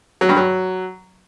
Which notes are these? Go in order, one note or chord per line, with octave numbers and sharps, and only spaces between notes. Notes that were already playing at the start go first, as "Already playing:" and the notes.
F#3
G2
F#3